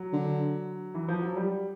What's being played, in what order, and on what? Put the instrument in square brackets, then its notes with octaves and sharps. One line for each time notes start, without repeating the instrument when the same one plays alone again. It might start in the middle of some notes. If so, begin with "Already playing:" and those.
Already playing: [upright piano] F#3
[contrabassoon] D3
[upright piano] E3
F3
F#3
G3